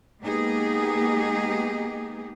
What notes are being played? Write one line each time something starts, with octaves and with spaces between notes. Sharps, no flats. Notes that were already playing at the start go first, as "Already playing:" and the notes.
G#3 A#3 B3 D#4 G4 G#4